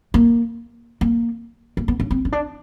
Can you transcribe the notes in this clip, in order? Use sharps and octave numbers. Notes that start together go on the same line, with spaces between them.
A#3
A#3
A#3
B3
C#4
C4
C#4
D4